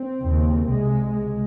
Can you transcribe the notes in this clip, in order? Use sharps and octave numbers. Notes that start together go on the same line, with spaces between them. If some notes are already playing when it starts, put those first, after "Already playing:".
Already playing: C4
D#2 C#3
C2 C3 G#3
C#2 G#3